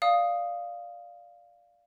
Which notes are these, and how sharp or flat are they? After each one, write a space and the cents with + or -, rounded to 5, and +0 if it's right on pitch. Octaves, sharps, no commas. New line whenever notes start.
D5 +0 F5 +0 D#6 +0